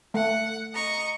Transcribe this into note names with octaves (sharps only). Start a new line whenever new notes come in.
A3 F#5
D#5 A#5 C#6